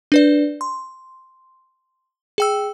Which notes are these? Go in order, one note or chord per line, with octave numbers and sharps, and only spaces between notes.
D4 B4 D5
C6
G#4 G5 E6